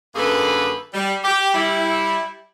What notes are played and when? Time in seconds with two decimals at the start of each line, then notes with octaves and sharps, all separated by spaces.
0.16 F#2 D3 A#3 G#4 A4 B4
0.94 G3
1.24 G4
1.54 G3 E4